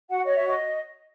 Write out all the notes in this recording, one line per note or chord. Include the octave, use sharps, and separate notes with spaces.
F#4 F#5
C#5 D#5
E5
F#4 D#5